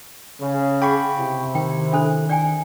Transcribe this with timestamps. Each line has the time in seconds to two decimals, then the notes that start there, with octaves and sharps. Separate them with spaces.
0.41 C#3
0.82 G#4 F#5 G5 B5 C#6
1.17 C3 E4
1.55 D#3 G5
1.93 D4 A4 C5
2.29 D5 G5 G#5